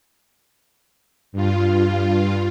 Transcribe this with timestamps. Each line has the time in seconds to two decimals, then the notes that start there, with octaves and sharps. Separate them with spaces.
1.32 G2 F4